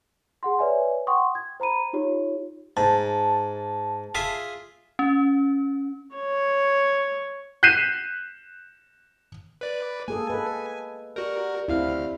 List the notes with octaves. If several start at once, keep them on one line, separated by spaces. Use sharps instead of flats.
G#4 F#5 C6
B4 C#5 D5 E5 G#5
F#5 G5 C6 C#6 D#6
G#6
C5 A#5 B5 D#7
D#4 F4 G4 C#5
G#2 A5
F4 G#4 E5
C#4
C#5
F#6 G6 B6 C7 D#7 E7
B4 D5
A#3 G#4 A4 G#5
A4 B4 D#5
F#4 G4 A#4 D5
D2 C4 E4 F5 F6